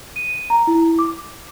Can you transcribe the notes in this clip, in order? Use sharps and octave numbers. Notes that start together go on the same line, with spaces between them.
D#7
A#5
E4
D6
D6